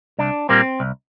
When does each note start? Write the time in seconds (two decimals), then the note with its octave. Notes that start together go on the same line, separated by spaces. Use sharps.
0.19 C2 D4
0.49 A#2 G3 A#3 C4
0.80 C2